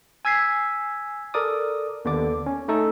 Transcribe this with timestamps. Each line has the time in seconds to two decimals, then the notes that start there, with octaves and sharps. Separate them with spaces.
0.25 G#5 E6 G#6 B6 C7
1.34 A4 A#4 D5 D6 D#6
2.05 D#2 D3 B3 D4 D5 D6
2.46 C#4
2.68 A3 D#4 A4